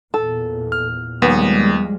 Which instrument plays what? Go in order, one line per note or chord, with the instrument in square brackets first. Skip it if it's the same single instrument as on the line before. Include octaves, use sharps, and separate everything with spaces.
[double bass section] E2 A#2 [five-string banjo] A4
[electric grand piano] F6
[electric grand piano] D#2 [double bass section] F3 G3 G#3 [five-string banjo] B3